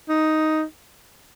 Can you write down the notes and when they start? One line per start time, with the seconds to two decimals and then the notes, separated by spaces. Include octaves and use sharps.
0.09 D#4